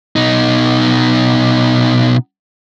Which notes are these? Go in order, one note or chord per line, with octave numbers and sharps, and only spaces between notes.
B2 D#4